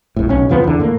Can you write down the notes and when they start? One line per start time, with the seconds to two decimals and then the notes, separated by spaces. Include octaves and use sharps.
0.16 A#1 A2
0.29 B1 C#4
0.49 E2 C#3 F3 B3
0.64 E2 D3
0.80 A2 A#3